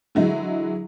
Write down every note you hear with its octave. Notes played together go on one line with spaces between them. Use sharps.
D3 E3 F#3 G#3 E4